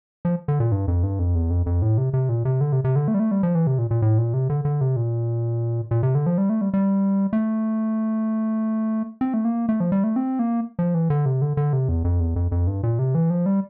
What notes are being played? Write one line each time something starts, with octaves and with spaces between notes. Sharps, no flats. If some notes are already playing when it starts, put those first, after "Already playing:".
F3
D3
A#2
G2
F2
G2
F2
E2
F2
F2
A2
C3
C3
A#2
C3
D3
C3
C3
D3
A3
G3
A3
G3
F3
E3
C3
A#2
A#2
A2
A#2
C3
D3
D3
C3
A#2
A#2
C3
D3
F3
G3
A3
G3
G3
A3
C4
A3
A#3
A3
F3
G3
A3
C4
A#3
F3
E3
D3
C3
D3
D3
C3
E2
F2
E2
F2
F2
G2
A#2
C3
E3
F3
G3